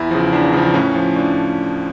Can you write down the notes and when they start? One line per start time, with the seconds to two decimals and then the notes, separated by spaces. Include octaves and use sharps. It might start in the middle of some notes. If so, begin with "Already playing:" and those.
Already playing: E2 E4
0.11 C#3 F3
0.33 E2 D4
0.53 C#3 F3
0.74 A2 C#4
0.95 F3
1.16 A2 D4